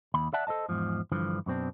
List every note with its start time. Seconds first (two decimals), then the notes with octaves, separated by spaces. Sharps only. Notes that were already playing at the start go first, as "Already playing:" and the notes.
0.14 D#2 B5
0.33 D5 E5 F#5 A5
0.47 A4 C5 D#5 A5
0.69 E2 G#2 F3
1.12 G2 D3 E3 F3
1.46 F#2 B2 C4 D4